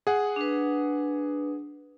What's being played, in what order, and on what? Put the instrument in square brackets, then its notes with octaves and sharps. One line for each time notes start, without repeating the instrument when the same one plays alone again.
[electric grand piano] G#4 F#5
[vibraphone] D4 B4